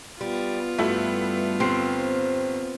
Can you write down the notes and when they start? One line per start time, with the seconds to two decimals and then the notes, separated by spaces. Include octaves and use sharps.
0.21 G3 B3 F4
0.78 G2 A3 E4 F#4
1.60 G1 C4 C7